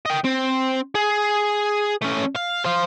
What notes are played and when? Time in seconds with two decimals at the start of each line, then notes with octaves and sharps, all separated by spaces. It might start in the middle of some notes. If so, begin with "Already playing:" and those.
0.06 D#5 G5
0.24 C4
0.95 G#4
2.02 A3 C#4
2.35 F5
2.64 C5 F5